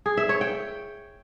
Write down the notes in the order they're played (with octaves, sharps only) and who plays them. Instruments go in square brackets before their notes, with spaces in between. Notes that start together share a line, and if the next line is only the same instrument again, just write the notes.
[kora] G#4
E5
C#5
G5